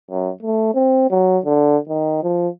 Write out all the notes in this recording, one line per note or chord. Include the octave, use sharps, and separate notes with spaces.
F#2
A3
C4
F#3
D3
D#3
F3